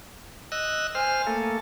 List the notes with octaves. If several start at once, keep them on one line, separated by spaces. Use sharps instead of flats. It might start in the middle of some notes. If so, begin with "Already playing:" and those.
D#5 E6 F#6
C5 G#5 F6
A3 A#3 A4